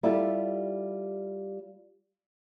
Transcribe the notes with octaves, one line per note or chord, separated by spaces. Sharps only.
G3 E4 F4 G4 A4